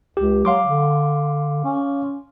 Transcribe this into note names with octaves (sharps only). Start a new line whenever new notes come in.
C#2 G4
F#3 F5 C6 D6
D3
C#4